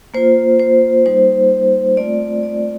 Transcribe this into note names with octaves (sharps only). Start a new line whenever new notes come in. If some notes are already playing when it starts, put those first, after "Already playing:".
A#3 F4 C5
C5
G3 A#3 D#4 C5
A3 C4 F4 D5
D5